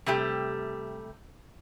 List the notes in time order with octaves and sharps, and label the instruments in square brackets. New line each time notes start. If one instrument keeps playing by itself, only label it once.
[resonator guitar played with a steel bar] C3 G3 A3 G4